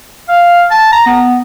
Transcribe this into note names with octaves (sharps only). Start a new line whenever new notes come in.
F5
A5
A#5
B3